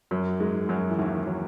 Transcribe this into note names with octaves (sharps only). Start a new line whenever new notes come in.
F#2 F#3
G#2 G#3
F#2 F#3
E3
D#2 D#3
F#3